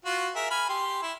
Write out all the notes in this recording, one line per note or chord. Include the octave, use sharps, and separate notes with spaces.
F4 F#4
G#4 A#4 E5
G#5 B5 F6
G4 C6
E4